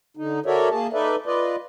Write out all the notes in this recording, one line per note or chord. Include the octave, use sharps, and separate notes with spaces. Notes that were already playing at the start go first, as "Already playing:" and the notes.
D3 D#4
F#4 A4 A#4 C#5 D5 E5
A#3 G#4 A5
D#4 A4 B4 D5 E5
F4 B4 D5 D#5